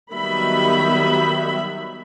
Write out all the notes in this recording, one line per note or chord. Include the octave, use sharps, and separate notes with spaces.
D#3 F#3 G3 B3 E5 B5